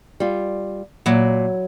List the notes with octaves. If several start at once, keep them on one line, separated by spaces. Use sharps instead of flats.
G3 F4
A#2 F#3 E4